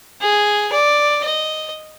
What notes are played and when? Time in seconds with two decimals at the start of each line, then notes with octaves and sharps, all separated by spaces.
0.21 G#4
0.72 D5
1.24 D#5